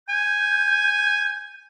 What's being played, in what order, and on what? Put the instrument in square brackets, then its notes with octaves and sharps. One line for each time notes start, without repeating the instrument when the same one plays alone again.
[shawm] G#5 [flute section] G6